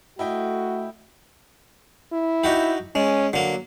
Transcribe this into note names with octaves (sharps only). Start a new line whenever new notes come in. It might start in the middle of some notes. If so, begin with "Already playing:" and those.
A3 E4 F#4 D#5 G5
E4
D#4 F#4 G4
G#3 C#4
D3 F#3 A#3